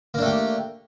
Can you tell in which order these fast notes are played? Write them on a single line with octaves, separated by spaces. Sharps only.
A#3 D4 A3 G4